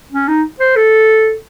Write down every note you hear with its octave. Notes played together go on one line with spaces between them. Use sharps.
C#4
D#4
C5
A4